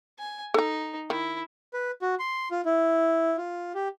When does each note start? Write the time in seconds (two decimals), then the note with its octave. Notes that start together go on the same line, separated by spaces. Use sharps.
0.19 G#5
0.54 D#4 A4 A#5
1.10 D#3 E4
1.74 B4
2.02 F#4
2.19 C6
2.51 F4
2.65 E4
3.37 F4
3.75 G4